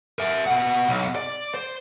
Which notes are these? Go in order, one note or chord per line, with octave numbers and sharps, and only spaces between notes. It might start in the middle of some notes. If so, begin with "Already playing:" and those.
A#4 E5
B2 F#5
B1
D5
C5